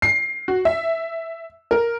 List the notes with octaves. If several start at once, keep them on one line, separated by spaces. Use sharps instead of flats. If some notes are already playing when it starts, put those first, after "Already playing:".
C7
F#4
E5
A#4